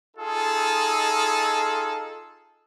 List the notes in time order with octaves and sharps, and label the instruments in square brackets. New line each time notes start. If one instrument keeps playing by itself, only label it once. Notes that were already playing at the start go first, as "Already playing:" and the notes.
[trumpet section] D#4 F4 G#4 A4